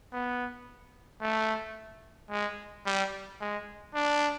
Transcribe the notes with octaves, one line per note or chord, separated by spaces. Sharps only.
B3
A3
G#3
G3
G#3
D4